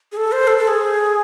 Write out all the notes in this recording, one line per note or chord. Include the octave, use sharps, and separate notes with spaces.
G#4
A4
C5
A4
A4
G#4